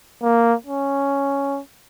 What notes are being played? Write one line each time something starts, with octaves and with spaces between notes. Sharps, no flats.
A#3
C#4